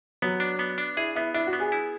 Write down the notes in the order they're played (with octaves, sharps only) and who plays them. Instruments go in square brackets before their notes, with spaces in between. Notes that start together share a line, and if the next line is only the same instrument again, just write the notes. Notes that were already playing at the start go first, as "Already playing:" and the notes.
[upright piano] F#3 [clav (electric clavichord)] B3
[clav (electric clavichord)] D4
B3
D4
[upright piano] E4 [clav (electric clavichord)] G#4
[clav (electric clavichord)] B3 [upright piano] E4
[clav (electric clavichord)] D4 [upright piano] E4
[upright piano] F#4
[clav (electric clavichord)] B3
[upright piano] G#4
[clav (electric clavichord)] E4